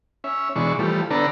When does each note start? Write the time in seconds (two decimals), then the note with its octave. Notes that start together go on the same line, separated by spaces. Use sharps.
0.24 C#4 E5
0.56 B2 E3 G#3 D4 C#6
0.79 E3 F3 G3 A3
1.11 D3 B3 D4 A4 A#5